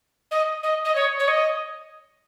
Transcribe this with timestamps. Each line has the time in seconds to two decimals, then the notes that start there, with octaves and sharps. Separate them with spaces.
0.31 D#5
0.63 D#5
0.85 D#5
0.95 C#5
1.19 C#5
1.28 D#5